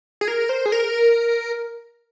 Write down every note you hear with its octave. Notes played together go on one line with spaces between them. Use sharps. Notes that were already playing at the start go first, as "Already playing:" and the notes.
G#4
A#4
C5
G#4
A#4